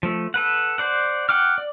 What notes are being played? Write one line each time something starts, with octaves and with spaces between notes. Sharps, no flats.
F3 A3
A4 B4 F#5
C5 D5 F#5
F#5 G5 D6 F6
D5